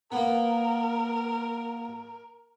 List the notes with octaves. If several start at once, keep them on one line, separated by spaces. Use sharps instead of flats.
A#3 B3 A#4